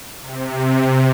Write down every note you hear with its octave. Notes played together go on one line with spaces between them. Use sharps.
C3